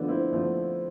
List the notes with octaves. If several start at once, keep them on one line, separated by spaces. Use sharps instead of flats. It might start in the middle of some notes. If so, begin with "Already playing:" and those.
Already playing: D3 F3 A3 B3 D4
C4 E4
D3 F3 A3 C4